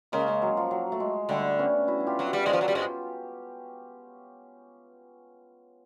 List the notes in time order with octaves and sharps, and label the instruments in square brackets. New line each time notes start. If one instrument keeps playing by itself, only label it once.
[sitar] C#3 [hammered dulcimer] G#3 A#3
[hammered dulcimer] G#3
F#3
F3
F#3
A3
G#3
[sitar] D3 [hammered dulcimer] G3 A3
[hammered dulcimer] B3 C#4
E4 F#4
G#4
F4 G4
[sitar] F#3
[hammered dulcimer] E4 F#4
[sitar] G3
[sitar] G#2 G#3 [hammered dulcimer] F4 G4
[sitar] F3
[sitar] F#3 [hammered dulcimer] A4
[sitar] G3 [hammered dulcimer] F#4 G#4
[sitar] G#2 G#3
[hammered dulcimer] F4 G4